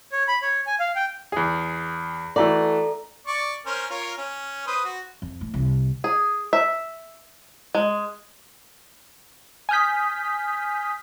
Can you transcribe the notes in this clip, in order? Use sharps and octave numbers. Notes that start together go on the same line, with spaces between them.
C#5
B5
C#5
G#5
F5
G5
E2 G#4
E3 A3 F#4 A4 D5 A#5
D5 C#6
C#4 A#4 C5
F4 A#4 C#5
C#4
B4 C5 D#6
F#4
F2
A2
C2
G#4
E5
G#3
G#5 D#6 F6 G6 B6